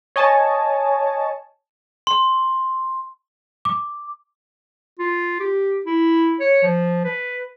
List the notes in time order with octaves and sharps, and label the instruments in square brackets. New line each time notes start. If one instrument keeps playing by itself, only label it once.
[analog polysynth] C#5 D#5 G#5 A5
[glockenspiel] C6
[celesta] D6
[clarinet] F4
G4
E4
C#5
F3
B4